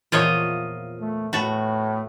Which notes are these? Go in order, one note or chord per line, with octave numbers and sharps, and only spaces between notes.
E2 A#2 F3 F4 C#5 D#5
A3
A2 F#4 B4 A5